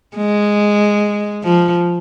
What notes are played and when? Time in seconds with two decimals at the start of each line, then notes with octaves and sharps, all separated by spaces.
0.17 G#3
1.44 F3